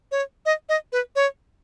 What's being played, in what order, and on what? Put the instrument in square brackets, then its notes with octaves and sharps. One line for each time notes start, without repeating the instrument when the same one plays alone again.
[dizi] C#5
D#5
D#5
B4
C#5